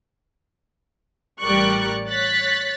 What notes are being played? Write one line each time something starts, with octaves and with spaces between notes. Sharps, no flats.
A1 G3 A#4 D5 C#6 F#6
C#5 F#6 A6 B6